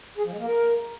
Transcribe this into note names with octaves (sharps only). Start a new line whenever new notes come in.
G#4
F3
G#3
A#3
A#4